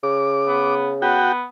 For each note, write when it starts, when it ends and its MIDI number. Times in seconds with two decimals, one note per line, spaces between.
0.03 1.26 49
0.03 0.75 86
0.47 0.91 59
1.02 1.44 59
1.02 1.32 66
1.02 1.32 79